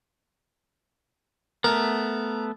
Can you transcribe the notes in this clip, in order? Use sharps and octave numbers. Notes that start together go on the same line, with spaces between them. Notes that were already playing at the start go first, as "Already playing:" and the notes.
A3 B3 A#4